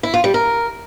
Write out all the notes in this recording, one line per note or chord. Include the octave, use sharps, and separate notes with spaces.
E4
F4
G3
A#4